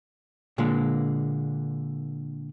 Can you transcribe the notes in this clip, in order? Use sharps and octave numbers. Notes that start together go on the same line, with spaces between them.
A#2 D3 G#3 A#3